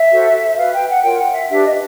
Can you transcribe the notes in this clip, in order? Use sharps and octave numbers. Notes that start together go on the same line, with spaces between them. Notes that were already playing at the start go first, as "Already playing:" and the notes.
Already playing: E5
F#4 A4 C5
F#4 B4 F5
G5
F#5
F4 A#4 C#5 G5
F#5
F5
E5
D4 G4 B4 E5
D#5